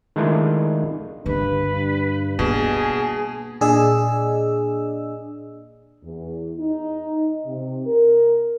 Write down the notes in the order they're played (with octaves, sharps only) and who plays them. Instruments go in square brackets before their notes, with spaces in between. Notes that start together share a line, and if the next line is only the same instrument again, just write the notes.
[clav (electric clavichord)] D#3 G#3 A3 D4 E4 F4
[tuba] G2 [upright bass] D3 D4 [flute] B4
[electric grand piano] B2 [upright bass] A#3 [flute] G#4
[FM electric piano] A#2 D4 G#4 D5 D#5 E6
[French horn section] E2
D#4
C3
A#4